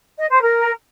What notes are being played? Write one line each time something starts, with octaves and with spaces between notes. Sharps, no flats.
D#5
C5
A#4